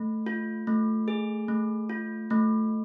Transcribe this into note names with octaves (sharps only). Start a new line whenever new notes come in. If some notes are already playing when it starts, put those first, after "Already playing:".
Already playing: A3
F4
A3
G#4
A3
F4
A3